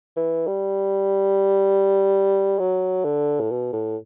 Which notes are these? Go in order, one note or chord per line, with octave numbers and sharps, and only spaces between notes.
E3
G3
F#3
D3
A2
B2
A2